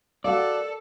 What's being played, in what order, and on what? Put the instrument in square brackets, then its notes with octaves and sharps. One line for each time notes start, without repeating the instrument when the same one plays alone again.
[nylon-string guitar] F#4 A#4 F5 [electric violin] A4 [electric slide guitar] D5